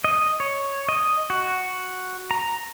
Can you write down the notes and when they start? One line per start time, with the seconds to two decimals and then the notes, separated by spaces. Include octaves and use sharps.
0.04 D#5
0.40 C#5
0.89 D#5
1.30 F#4
2.31 A#5